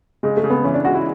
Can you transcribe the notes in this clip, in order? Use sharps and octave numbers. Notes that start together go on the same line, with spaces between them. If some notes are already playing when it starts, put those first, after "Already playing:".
C#3 G#3
A3
C#3
B3
E3 C#4
D4
G#3 F#4
E4